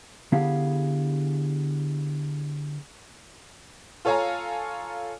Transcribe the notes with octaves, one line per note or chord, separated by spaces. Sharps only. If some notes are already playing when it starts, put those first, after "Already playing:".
D3 B3 E4 G4 G#4 F5
F4 A4 C#5 F5 G#5 A#5